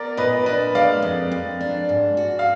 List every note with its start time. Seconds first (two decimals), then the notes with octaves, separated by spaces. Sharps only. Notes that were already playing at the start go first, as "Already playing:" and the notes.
Already playing: B3 A#4 D5
0.17 A#2 B4 D#5
0.46 D4 B4 D#5
0.75 G#3 D5 F5
1.02 F2
1.31 F2
1.61 D4
1.89 G#2
2.17 F#4
2.39 F5